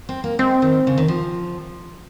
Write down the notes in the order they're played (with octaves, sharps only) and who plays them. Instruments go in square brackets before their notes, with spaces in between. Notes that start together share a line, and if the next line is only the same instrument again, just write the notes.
[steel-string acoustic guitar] C4
A#3
[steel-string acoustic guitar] G#3 [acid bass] C4
[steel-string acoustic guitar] D#3
C#3
D#3
F3